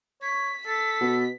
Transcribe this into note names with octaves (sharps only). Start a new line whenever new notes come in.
C#5 B6
A4 B6
B2